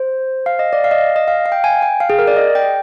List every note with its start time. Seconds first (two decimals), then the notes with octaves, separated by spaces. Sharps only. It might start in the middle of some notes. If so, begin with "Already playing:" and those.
Already playing: C5
0.46 F5
0.59 D#5
0.73 D5
0.84 F5
0.91 D#5
1.16 D#5
1.28 F5
1.46 F5
1.52 G5
1.64 G#5
1.82 G5
2.00 F5
2.10 G#4
2.19 A#4
2.27 D5
2.37 D#5
2.55 G5